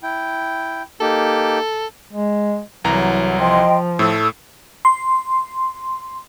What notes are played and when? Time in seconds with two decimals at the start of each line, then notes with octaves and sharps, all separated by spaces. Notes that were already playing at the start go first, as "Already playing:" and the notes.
0.03 E4 G5
1.01 A#3 D#4 G4 A4
2.13 G#3
2.84 C2 E3 F#3 A#5
3.40 F3 D#5 G5 C6
3.99 A2 A3 E6
4.85 C6